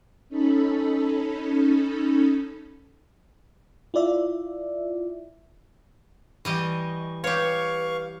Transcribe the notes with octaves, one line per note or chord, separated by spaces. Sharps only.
C#4 D#4 A4 B5
E4 F4 D5 E5
E3 G3 D#5 C#6
G4 B4 C#5 F5 C#6